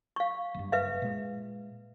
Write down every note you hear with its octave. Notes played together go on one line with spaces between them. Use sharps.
F5 C#6
F#1 G2
B4 E5 F5
A#2 G#3